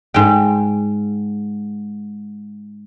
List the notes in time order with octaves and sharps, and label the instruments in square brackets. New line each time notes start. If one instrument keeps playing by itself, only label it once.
[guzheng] G#2 G5